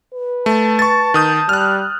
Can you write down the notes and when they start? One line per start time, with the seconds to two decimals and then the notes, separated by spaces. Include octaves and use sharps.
0.14 B4
0.46 A3 A5
0.79 C#6 A6
1.14 D#3 D#6 G6
1.49 G3 F6 F#6